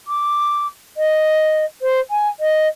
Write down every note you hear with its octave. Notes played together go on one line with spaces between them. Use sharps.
D6
D#5
C5
G#5
D#5